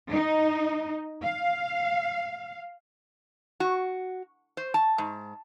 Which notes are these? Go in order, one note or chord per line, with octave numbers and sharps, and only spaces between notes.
D#4
F5
F#4
C5
A5
G#2